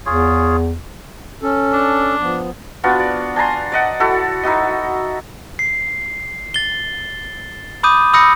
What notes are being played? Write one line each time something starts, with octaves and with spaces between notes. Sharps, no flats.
E2 F4 G#4 C#5
C#4 A4
D4
F3 B3
B3 D4 F4 F#4
D5
D4 G#5 A#5 C6
D5 D#5 F#5
E4 F#4 A4
D#4 E4 F#4 D#5
C7
A6 G7
B5 D6 D#6 G6 D#7
B5 D#6 E6 G6 A#6 C#7